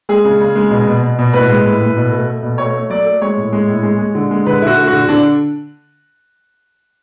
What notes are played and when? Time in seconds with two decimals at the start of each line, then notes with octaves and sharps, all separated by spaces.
0.09 G#3 G#4
0.24 C#3
0.40 C#3
0.56 G#3
0.70 B2
0.87 B2
1.02 B2
1.19 B2
1.33 A2 B4
1.49 G#3
1.65 A2
1.81 A2
1.97 B2
2.11 A3
2.27 A3
2.43 B2
2.58 A3 C#5
2.74 A3
2.90 F#3 D5
3.06 A3
3.22 G#3 C#5
3.37 A2
3.53 G#3
3.67 A2
3.83 G#3
3.98 G#3
4.15 D3
4.31 G#3
4.46 D3 B4
4.62 D3 E4 F#4
4.78 A3
4.87 F#4
4.93 D3
5.08 D3 D4